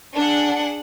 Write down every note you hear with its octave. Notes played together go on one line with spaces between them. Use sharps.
D4 G#4 F#5